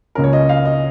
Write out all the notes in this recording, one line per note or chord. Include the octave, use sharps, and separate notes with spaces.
C#2 C#3 A#3 C#4 A#4
C#5
D#5
F5
D#5